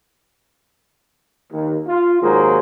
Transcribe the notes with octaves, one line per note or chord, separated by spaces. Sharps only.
D#2
F4
D#2 G#2 F#3 A#3 G#4 C5